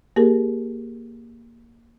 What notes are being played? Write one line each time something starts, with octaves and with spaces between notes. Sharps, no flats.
A#3 G4 G#4 A#4